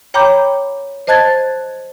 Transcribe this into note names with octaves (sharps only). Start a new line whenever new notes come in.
C#5 G5 A#5 B5 D6 G6
C5 D#5 A5 F#6 G#6 A6